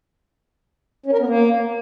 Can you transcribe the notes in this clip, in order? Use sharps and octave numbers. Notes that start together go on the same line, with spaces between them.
C#4
A#4
B3
A#3